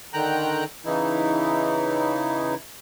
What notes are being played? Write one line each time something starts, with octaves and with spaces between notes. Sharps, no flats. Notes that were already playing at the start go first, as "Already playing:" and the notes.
D3 D#3 G5 A#5 F#6
C#3 E3 D#4 E4